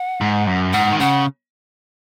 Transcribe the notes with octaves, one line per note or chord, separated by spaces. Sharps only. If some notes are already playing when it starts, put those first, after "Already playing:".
Already playing: F#5
G#2
F#2
G#2 F#5
D#3
C#3 F#5